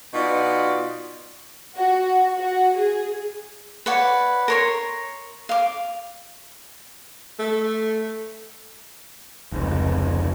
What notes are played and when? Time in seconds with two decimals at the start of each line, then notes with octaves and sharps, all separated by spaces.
0.14 B2 B3 D#4 F4 D5
1.77 F#4
2.37 F#4
2.76 G#4
3.86 B4 C#5 D5 F#5
4.48 A#4 C#5 C6
5.49 F5 D6
7.39 A3
9.52 F1 C#2